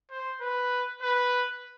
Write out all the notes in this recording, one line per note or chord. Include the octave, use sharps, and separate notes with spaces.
C5
B4
B4